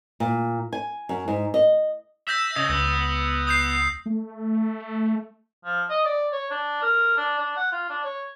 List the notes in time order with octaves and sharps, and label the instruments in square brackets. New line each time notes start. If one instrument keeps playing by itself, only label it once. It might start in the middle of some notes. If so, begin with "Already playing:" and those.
[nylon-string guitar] A#2
G#5
F#2
G#2
D#5
[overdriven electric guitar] E5 [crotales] E6 G6 A#6
[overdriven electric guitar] C#3 [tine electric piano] D#5 [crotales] D#6
[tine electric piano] C#2 [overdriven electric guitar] B3
[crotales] D#6 G6 C7
[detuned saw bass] A3
[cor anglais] F3
D#5
D5
C#5
D4
A#4
D4
D4
F#5
F4
D4
C#5